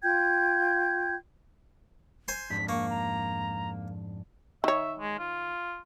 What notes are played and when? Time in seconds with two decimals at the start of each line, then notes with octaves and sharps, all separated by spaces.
0.03 F4 G5 G6 G#6
2.28 C5 G#5 C6
2.50 F2 G#2 D4 B6
2.69 A#3 C#6
2.90 A#5
4.64 D#3 C#5 E5
4.99 G#3
5.19 F4